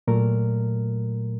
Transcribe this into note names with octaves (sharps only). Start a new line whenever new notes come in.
A#2 F#3 A3 A#4